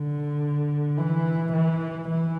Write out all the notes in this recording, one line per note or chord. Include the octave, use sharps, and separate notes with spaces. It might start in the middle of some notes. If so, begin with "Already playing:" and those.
Already playing: D3
E3
E3
E3